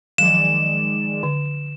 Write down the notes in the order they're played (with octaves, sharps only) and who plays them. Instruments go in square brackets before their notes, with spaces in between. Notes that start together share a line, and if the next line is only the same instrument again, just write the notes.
[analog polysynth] D#3 G#3 D5 [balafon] F3 F#3 [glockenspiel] E7
[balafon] D3